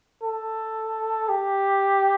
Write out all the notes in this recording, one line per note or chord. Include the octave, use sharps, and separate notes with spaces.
A4
G4